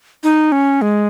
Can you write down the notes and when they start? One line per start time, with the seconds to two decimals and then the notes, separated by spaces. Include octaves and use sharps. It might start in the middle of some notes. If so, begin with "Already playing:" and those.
0.23 D#4
0.52 C#4
0.82 G#3